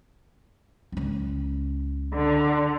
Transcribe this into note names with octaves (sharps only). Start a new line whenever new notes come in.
C#2 C#4
D3